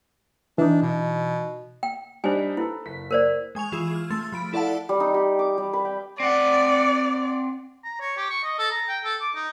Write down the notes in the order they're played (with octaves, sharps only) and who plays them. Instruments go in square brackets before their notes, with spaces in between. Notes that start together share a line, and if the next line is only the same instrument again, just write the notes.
[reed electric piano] E3 D#4 [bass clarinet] D4
[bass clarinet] B2
[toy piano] G5
[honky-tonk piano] G3 D4 D#4 [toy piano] C5 G#5
[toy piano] E4 [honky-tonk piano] A4 B4
[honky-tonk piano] F#1 B6
[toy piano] A#4 C5 D5
[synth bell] G#3 G#5 C#6 F7
E3 F4 G#4 G#6 E7
F6
A3 C6 A6
F3 B5 D7
E4 A4 D5 F5 F#5 A5
[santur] G3
D#4
G4
D6
G3
B4
G5
[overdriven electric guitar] C4 F#5 [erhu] D5
[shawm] A#5
C#5
G4
C#6
D#5
A4
A#5
G5
A4
D6
D#4